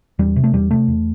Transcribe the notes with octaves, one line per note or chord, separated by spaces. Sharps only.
E2 G3
C3
A3
E2 G3
C3 A3
E2